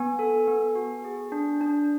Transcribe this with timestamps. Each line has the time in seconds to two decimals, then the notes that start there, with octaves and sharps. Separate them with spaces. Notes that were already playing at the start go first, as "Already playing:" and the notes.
Already playing: B3 G#5
0.19 A4
0.48 B3
0.75 F#4
1.04 G#4
1.32 D4
1.61 D4